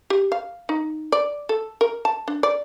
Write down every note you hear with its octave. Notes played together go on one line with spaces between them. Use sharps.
G4
F5
D#4
D5
A4
A#4
A5
D4
D5